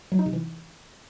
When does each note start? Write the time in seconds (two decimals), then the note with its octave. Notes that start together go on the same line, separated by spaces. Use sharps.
0.12 F#3
0.19 D#4
0.26 C3
0.33 E3